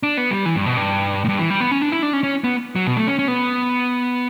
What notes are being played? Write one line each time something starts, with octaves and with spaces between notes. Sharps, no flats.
D4
B3
G3
E3
G2
B2
G2
A2
G2
E3
G3
B3
C#4
D4
E4
D4
C#4
C#4
B3
F#3
B2
A3
C#4
C#4
B3